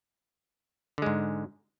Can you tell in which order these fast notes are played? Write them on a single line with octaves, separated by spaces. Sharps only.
D3 G#3 G#2